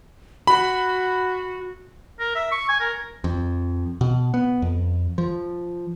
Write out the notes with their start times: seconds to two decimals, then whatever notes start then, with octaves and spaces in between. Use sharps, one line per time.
0.47 F#4 B5
2.20 A#4
2.35 E5
2.52 C#6
2.68 G#5
2.80 A#4
3.24 F2
4.01 B2
4.34 B3
4.62 F2
5.18 F3